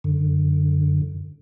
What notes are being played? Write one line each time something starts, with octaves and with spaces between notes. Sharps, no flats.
F#2 D3